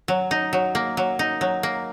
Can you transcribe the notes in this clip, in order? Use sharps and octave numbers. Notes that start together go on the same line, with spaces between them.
F#3
D#4
F#3
A#3
F#3
D#4
F#3
A#3